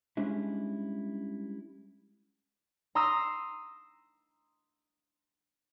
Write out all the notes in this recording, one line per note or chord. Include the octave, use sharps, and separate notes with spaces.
G3 G#3 C#4 D4 E4
A#5 C6 D#6 E6 A#6